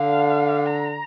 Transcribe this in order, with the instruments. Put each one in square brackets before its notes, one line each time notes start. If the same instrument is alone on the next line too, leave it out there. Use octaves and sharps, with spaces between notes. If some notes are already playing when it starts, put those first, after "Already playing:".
Already playing: [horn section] D3 [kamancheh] F5
[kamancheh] A#5